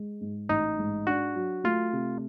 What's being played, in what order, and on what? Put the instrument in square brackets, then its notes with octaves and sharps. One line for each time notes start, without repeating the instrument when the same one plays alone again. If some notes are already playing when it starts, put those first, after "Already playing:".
Already playing: [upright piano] G#3
G#2
[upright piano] A1 [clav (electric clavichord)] D#4
[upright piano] G#2
[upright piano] D4 [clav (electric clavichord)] F#4
[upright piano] F#3
[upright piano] A3 [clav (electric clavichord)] F4
[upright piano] C3